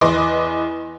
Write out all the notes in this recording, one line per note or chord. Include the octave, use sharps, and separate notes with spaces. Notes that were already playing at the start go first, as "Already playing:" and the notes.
E2 B4 D#5 C6 D6